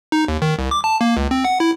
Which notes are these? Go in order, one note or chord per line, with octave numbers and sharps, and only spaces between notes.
D#4
D#2
D#3
C2
D6
A5
A#3
C#2
C4
F#5
E4